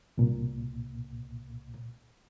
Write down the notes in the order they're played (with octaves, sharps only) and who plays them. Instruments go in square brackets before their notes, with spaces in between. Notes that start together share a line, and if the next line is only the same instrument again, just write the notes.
[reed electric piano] C2 A#2